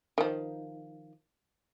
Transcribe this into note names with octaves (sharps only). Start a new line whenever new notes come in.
D#3 F3